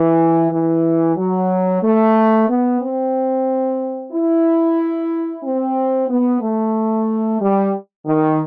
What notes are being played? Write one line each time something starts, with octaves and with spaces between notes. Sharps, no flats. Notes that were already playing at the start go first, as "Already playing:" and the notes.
Already playing: E3
E3
F#3
A3
B3
C4
E4
C4
B3
A3
G3
D#3